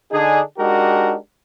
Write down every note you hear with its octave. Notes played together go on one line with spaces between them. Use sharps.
D3 D4 D#4 G#4
G#3 D4 D#4 F#4 G4 A#4